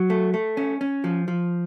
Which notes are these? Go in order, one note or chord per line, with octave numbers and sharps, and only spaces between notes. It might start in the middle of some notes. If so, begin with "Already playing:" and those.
Already playing: F#3
A3
A3
C#4
C#4
F3
F3